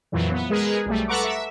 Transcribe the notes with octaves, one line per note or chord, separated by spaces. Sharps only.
F2 A#2 E3 F#3
B3
G#3 G#4 A#4 B4
B1 G3 A3
A4 B4 F#5 A#5 C#6 D6
E5